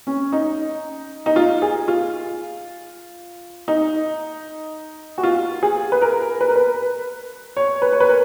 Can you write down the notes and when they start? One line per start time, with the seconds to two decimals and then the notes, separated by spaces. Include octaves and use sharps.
0.07 C#4
0.32 D#4
1.26 D#4
1.36 F4
1.62 G#4
1.88 F4
3.68 D#4
5.18 F#4
5.23 F4
5.63 G#4
5.92 B4
6.02 A#4
6.41 B4
6.48 A#4
6.56 B4
7.57 C#5
7.82 B4
7.93 C#5
8.00 B4
8.08 A#4